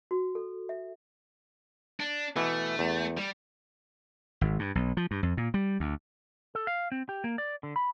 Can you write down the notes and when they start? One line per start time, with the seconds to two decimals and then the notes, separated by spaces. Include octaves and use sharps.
0.11 F#4
0.35 A4
0.69 E5
2.00 D4
2.36 B2 E3 A3
2.79 E2
3.17 G3
4.41 G#1
4.59 G2
4.75 B1
4.97 F3
5.11 G2
5.23 F2
5.37 A#2
5.54 G3
5.80 D2
6.55 A4
6.67 F5
6.92 C4
7.09 G4
7.24 A#3
7.38 D5
7.63 D3
7.76 B5